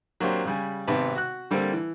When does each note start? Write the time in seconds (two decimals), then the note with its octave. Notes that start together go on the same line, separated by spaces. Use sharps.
0.20 F#3 A#3 C4 D4 G4 C5
0.45 C#3 G3 G#5
0.88 G#1 C3 B3 D#4 B4 A5
1.15 F#4 F#6
1.51 D3 G3 A#3 C4 A4
1.73 E3